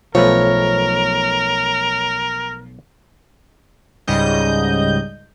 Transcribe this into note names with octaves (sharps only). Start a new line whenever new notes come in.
B1 F3 A3 A#4 B4 C#5
C#2 G#2 C#3 G3 D#5 G6